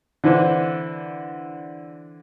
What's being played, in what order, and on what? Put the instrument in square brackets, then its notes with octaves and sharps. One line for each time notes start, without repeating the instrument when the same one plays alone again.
[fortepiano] D3 E3 C4 D4 E4